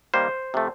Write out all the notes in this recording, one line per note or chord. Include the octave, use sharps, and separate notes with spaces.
D#3 G3 A#3 C5
C3 F3 A3